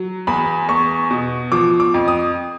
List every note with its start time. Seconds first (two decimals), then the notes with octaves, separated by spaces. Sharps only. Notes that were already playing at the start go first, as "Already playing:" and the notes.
Already playing: F#3
0.27 E2 B5
0.69 E2 C#6
1.11 B2
1.52 F3 D6
1.80 D6
1.94 F2
2.08 D#6